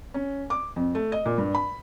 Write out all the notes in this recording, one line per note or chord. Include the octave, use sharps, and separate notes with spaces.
C#4
D6
F2
A3
D#5
A#2
G2
B5